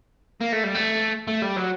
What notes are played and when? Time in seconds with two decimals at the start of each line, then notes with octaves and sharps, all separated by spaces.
0.41 A#3
0.52 A3
0.63 G3
0.74 A3
1.28 A3
1.42 G3
1.56 F#3